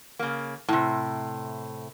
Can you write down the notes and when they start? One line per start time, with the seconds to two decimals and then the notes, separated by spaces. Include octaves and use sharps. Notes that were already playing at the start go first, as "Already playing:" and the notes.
0.19 C#3 A#3
0.68 A2 C3